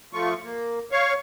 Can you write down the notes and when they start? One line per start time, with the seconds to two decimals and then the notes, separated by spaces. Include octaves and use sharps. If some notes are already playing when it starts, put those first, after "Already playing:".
0.13 F3 A3 F4 C#6
0.44 A#3
0.92 C#5 F5 C#6